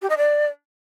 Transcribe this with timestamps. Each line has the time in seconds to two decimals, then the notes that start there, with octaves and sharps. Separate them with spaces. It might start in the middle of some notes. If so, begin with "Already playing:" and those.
0.02 G4
0.09 D#5
0.17 D5